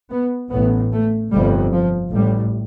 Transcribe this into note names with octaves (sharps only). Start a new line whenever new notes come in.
B3
A1 A2 B3
A3
G1 F2 C3 G3
F3
A1 A2 G3